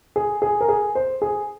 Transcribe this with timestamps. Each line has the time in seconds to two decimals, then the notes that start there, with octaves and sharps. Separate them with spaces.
0.16 G#4
0.42 G#4
0.61 A#4
0.69 G#4
0.95 C5
1.22 G#4